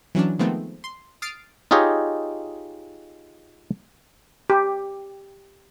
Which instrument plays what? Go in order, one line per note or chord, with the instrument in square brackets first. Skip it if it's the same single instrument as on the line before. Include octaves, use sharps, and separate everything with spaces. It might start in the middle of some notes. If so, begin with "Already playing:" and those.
[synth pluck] E3 F#3 C#4 D4
D#3 F3 G#3 A3 B3 C4
C6
D#6 F6 A6 C7 D7
[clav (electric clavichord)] D#4 F4 G4 G#4 C#5 D#5
[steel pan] G4